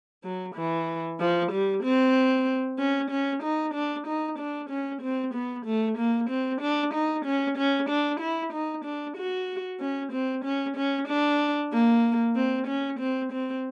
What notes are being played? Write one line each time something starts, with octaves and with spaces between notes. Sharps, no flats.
F#3
E3
F3
G3
C4
C#4
C#4
D#4
D4
D#4
D4
C#4
C4
B3
A3
A#3
C4
D4
D#4
C#4
C#4
D4
E4
D#4
D4
F#4
C#4
C4
C#4
C#4
D4
A#3
C4
C#4
C4
C4